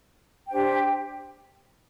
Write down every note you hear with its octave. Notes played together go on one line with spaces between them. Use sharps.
D4 G4 C5 G5